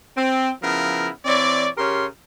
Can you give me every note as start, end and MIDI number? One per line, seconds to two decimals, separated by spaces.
0.16 0.50 60
0.62 1.08 49
0.62 1.08 53
0.62 1.08 59
0.62 1.08 64
0.62 1.08 70
1.25 1.68 52
1.25 1.68 60
1.25 1.68 73
1.25 1.68 74
1.77 2.06 49
1.77 2.06 67
1.77 2.06 70
1.77 2.06 73
1.77 2.06 84